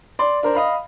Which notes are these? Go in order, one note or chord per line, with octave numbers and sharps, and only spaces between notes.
D5 C6
D4 A#4 C5
D#5 F5 B5